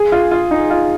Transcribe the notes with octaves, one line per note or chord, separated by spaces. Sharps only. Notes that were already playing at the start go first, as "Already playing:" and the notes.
Already playing: G#4
F4
F4
D#4
F4